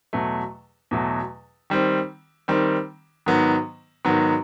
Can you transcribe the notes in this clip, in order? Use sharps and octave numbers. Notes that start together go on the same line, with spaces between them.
E2 B2 F#3 A3
E2 B2 F#3 A3
D#3 G3 C4
D#3 G3 C4
G#2 D#3 F#3 B3
G#2 D#3 F#3 B3